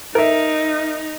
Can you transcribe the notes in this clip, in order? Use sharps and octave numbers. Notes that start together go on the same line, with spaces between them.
D#4 A#4 E5